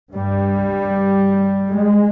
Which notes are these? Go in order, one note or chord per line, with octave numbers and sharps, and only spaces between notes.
G2 G3
G#3